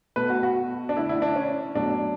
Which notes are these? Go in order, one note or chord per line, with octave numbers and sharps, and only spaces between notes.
B2 A3 B4
F#4
F#4
D4
D3 A3 E4
E4
D4
C#4
B2 F#3 A3 D4